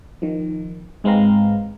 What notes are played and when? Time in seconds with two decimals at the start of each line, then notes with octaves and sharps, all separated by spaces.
0.22 D#3 F3
1.04 G#2 G#3 C4 B4 F5 A#5